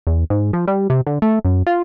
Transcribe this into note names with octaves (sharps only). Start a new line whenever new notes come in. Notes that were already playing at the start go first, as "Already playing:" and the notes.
E2
G#2
F3
G3
C3
D3
A3
F#2
F4